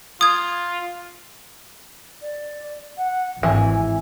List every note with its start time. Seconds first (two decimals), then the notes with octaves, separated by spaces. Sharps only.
0.21 F4 D#6 G#6
2.22 D5
2.97 F#5
3.43 G#1 E3 G#5